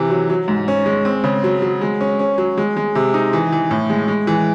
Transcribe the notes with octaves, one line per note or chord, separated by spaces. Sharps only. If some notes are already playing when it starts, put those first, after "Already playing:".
Already playing: C3 E3
F#3
F#3
G#2
C#4
G#3
C4
C#3
F#3
F#3
G#3
C#4
C#4
F#3
G#3
G#3
C3
D#4
E3
E3
A2
G#3
G#3
E3